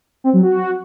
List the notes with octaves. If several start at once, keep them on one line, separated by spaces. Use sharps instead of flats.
C4
F#3
F#4